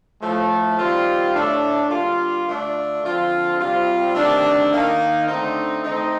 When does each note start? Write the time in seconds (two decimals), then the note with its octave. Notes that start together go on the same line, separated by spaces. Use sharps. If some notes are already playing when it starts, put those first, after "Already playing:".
0.21 A2 F3 A3
0.78 D#3 G3 C4 F4
1.34 A2 A3 D4
1.90 D3 G3 A#3 F4
2.46 D3 A3 D4 F4
3.03 D3 F3 C4 F4
3.59 C3 G3 C4 F4
4.15 C3 D#3 A3 D4
4.72 D#3 A#3 D#4
5.28 D3 A3 C4 D#4
5.84 D#3 A3 C4 D#4